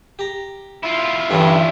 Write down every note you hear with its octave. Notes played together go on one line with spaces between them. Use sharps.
G4 A#5
E4 F4
G2 D3 E3 C#4